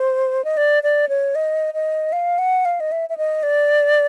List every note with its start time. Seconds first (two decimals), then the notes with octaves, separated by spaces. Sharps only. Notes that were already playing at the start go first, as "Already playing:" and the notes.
Already playing: C5
0.44 D#5
0.57 D5
0.83 D5
1.09 C#5
1.35 D#5
1.74 D#5
2.12 F5
2.38 F#5
2.65 F5
2.80 D#5
2.92 E5
3.09 E5
3.17 D#5
3.43 D5